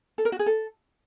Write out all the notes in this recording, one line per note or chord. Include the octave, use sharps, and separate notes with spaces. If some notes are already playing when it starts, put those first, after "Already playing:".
A4
A#4
F#4
G#4
A4